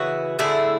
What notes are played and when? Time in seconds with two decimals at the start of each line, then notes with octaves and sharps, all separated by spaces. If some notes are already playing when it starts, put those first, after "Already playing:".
Already playing: C#3 E3 B3 F#4
0.39 D3 A3 E4 G#4